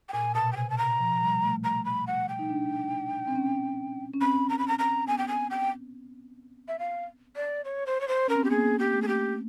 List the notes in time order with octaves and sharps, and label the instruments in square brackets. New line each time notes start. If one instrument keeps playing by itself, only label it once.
[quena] G5
[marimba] A#2 [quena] G#5
[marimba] B2 [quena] A5
[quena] G5
[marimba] C3 [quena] G#5
[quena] A5
A#5
[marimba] F3
G3
A3
[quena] A#5
B5
F#5
G5
[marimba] D#4
D4
C4
C#4
C#4
[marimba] C4 [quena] B5
[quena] A#5
B5
A#5
A#5
[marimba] B3 [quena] G#5
[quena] G5
G#5
G5
E5
F5
D5
C#5
C5
C#5
C5
[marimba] C#4 [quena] A#4
[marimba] C4
[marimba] B3 [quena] G4
[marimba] A#3 [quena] G#4
[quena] G4
[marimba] A3
[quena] G#4
G4